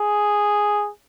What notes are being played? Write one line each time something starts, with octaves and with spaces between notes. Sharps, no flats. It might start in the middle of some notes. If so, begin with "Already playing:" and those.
Already playing: G#4